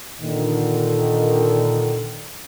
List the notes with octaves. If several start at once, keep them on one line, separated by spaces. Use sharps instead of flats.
A#2 D3 D#3